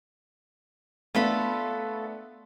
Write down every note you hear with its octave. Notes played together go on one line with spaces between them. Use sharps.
A3 B3 D4 F4 A4 B5